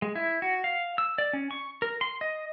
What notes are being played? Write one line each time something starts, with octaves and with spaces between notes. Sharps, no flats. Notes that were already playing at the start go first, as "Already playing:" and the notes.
G#3
E4
F#4
F5
E6
D5
C#4
C#6
A#4
C6
D#5